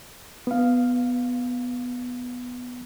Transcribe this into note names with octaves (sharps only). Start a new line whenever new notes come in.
B3 F5